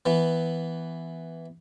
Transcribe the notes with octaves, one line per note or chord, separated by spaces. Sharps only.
E3 B3